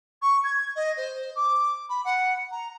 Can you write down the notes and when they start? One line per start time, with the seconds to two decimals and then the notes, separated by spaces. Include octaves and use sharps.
0.22 C#6
0.44 G#6
0.76 D#5
0.97 C5
1.35 D6
1.89 B5
2.04 F#5
2.51 A#5